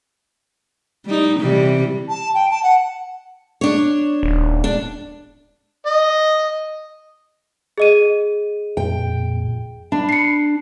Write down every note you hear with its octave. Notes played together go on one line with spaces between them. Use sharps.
G3 D#4
C3 E3 G3
A5
G5
A5
F#5
D4 C#5
D#1
D4
D#5
G#4 D#5 D#7
F2 A#2 G5
D4 B5
C7 C#7